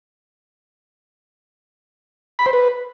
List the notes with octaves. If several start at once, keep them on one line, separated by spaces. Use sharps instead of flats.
B5
C5
B4